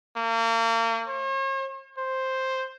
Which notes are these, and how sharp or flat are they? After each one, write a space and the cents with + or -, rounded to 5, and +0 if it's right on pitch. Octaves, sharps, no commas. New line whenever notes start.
A#3 -35
C#5 -45
C5 +5